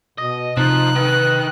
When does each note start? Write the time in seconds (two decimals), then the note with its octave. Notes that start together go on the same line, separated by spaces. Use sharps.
0.18 B2 D#5
0.57 C3 F3 D#4 F#6
0.96 D#3 B4